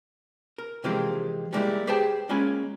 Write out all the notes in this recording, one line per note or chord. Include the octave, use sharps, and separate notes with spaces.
A#4
C3 E3 F3 G#3 A#3 G4
G3 G#3 A#3 D4 E4 G4
G4 G#4 B4 C5 G5 A5
G#3 A#3 C#4 F4 G#5 B5